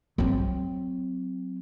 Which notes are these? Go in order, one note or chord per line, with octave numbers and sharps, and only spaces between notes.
F#3 C4